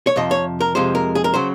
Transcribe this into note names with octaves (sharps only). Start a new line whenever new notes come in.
C#5
F2 C3 F3 D#5
C#5
A#4
F2 C3 F3 G#3 C5
A#4
G#4
A#4
C#3 F#3 C5